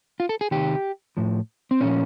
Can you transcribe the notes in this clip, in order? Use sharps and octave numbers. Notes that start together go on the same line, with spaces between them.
F4
A4
G#4
C3 D#3 G4
A2 F3
C4
A#2 F3 C#4